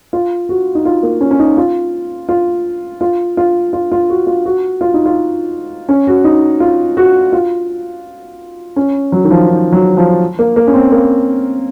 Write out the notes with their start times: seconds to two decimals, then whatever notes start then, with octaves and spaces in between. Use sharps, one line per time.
0.13 F4
0.49 F#4
0.75 D#4
0.85 F4
1.03 A#3
1.21 C#4
1.31 C#4
1.39 D#4
1.57 F4
2.29 F4
3.01 F4
3.37 F4
3.73 F4
3.92 F4
4.10 F#4
4.27 F4
4.45 F#4
4.81 F4
4.94 D#4
5.06 F4
5.89 C#4
6.07 F#4
6.24 D#4
6.60 F4
6.97 F#4
7.32 F4
8.76 C#4
9.12 F#3
9.24 D#3
9.31 F3
9.49 D#3
9.72 F#3
9.97 F3
10.39 A#3
10.56 A#3
10.67 C#4
10.74 C4
10.92 A#3